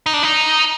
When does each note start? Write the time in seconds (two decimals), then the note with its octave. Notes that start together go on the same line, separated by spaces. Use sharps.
0.06 D#4
0.14 D4
0.23 D#4